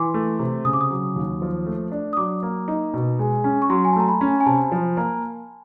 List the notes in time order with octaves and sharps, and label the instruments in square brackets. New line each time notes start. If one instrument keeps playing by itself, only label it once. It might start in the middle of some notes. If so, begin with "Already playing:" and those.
Already playing: [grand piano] E3 [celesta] C6 D6
[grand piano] A3
C3
[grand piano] C#3 [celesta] D#6
[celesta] D6
D#6
[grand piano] F#3
D#2
F3
A3
D4
[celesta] D#6
[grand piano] F#3 [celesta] D6
[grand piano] A#3
D#4
B2
G#3
C#4
[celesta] C#6
[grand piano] F#3 [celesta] C6
[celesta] G#5
A5
[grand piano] A3 [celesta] A#5
[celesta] B5
[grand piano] C#4
[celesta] G#5
[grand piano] C3 [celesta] A5
[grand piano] F3
A#3